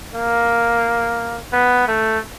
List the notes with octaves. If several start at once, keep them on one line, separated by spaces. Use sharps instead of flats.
A#3
B3
A3